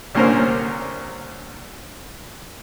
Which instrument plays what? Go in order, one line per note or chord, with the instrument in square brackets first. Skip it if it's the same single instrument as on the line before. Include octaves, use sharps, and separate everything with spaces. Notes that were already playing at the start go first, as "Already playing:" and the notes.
[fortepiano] C2 A#2 D3 C#4 A#4 C5